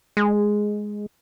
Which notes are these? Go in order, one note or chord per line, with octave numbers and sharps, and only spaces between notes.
G#3